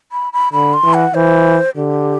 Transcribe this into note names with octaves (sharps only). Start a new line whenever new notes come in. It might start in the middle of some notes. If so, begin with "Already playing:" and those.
B5
B5
D3 B5
C6
E3
F#5
E3 C5
D3 G4